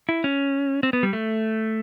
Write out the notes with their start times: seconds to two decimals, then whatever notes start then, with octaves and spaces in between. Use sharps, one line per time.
0.09 E4
0.24 C#4
0.83 C4
0.93 B3
1.03 G3
1.13 A3